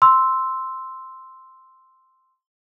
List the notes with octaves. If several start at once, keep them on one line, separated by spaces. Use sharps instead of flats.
C6 E6